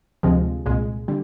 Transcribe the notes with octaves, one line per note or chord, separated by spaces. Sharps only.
D2 C3 F3 G#3
C2 A#2 G#3
D3 G3